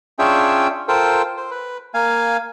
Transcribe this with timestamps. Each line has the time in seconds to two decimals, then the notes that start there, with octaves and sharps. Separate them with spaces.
0.19 C#4 D4 F4 G#4 E5 G5
0.88 F4 A4 A#4 C5 G5
1.37 C5
1.51 B4
1.94 A#3 F5 G#5